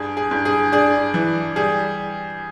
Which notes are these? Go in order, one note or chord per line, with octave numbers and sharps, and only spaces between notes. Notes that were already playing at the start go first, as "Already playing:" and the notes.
Already playing: G2 G#4
G#4
G2
G#4
D4 G#4
E3
G3 G#4